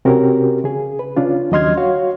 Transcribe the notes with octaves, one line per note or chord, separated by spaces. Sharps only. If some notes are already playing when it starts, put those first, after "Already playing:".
C3 C4 C#4 F#4 G4 A#4
C#3 G#4
B4
C#3 C#4 D4 F4
D#2 F#3 D#5 C6 F6 G#6
F#4 C#5 F5